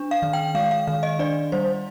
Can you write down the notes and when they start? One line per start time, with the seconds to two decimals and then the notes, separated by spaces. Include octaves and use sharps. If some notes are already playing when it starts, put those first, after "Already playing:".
Already playing: D4
0.11 F5
0.22 D#3
0.33 G5
0.55 G#3 F5
0.71 F5
0.87 D#3 F5
1.03 D#5
1.19 D4 D5
1.52 G3 C5